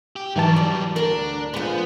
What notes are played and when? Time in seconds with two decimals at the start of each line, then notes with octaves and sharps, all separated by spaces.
0.16 G4
0.36 G#2 E3 F#3 G3 A5
0.56 D5
0.96 D2 D4 A#4
1.54 F3 G#3 B3